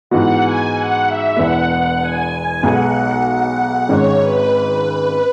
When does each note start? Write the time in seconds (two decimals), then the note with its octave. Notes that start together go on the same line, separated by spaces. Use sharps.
0.10 G#2 E3 B3 F#4 F#5
0.43 G#5
0.74 F#5
1.06 E5
1.37 E1 E2 E3 B3 F#5
2.01 G#5
2.63 B1 B2 G#3 B3 F#5
3.26 F#5
3.89 G#1 G#2 G#3 C#4 C#5
4.21 B4